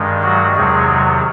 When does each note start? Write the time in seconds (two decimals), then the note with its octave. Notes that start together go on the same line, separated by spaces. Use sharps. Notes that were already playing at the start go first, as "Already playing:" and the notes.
Already playing: G2 D#3 G#3
0.23 F#3 F#4
0.55 E2 C3 D#3 F#3 G#3 G#4